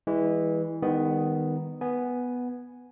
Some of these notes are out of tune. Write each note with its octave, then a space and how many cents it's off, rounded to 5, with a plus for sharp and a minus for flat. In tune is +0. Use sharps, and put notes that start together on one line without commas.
E3 -15 G#3 -40
D#3 +0 G3 +45 B3 +10
B3 +0 G#5 +0